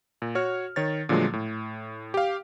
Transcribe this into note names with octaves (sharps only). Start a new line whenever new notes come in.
A#2
F#4 C#5 F6
D#3 C#5 A6
A#2 D3 F3 F#3 G#3 A3
A2
G4 F5